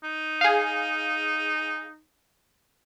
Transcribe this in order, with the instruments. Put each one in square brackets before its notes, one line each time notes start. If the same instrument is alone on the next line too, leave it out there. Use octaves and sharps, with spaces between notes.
[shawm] D#4
[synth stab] G#4 F5